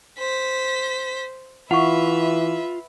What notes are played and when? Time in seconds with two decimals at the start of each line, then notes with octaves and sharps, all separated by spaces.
0.19 C5 B6
1.71 E3 F4 B4 E5 F#5 C#6